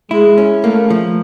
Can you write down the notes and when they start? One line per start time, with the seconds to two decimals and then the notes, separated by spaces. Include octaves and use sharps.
0.11 G#3 E4
0.38 C#4
0.64 A3 A#3
0.90 F3